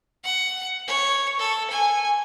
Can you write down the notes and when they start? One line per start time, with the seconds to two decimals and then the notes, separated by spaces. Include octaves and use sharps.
0.24 F#5
0.88 C#5
1.39 A4
1.70 G#5